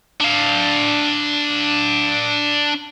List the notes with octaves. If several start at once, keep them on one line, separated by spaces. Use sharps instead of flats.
D4 F5